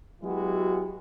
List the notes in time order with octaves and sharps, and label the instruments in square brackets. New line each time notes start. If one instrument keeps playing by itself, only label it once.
[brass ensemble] F#3 G#3 B3 E4 F#4 G4